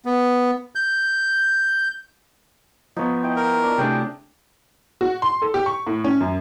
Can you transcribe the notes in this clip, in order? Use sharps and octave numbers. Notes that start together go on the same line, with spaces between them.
B3
G6
F3 B3 D#4 C#5
E4 D#5 G5
A#4
D4 D5
C3 F#3 A3 D4 G#4 G5
F#4
C6
A4
G4
C#6
A2
C#4
F#2